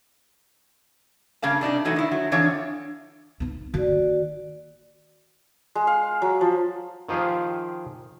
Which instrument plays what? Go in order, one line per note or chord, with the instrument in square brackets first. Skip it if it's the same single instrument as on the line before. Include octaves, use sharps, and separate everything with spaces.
[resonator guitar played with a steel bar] G2 C#3 A#3 F5 A5
C3 D4 D#4 G4
E3 F#3 A3 D#4
D#3 E4
F#3
F2 D3 E3 D4 C#5 F5
[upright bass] B3 D#4
[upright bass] D#3 A#3 [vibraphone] F#4 D5
[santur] G#3
F5
F#3
F3
[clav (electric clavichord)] D#3 F3 F4 G4 G#4